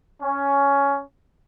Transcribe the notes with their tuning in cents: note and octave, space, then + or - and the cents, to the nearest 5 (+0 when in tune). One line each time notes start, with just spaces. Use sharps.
C#4 +10